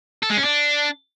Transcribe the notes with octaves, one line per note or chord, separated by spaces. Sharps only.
A4
G#3
C#4
D4